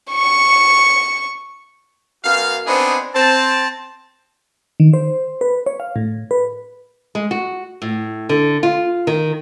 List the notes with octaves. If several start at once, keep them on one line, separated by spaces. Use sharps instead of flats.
C#6 C#7
F#2 B3 F#4 F5
B3 C4 D4 D#4 G#4
C4 A5
D#3
C5
B4
C#5
F5
A2
B4
G#3
F#4
A2
D3
F4
D#3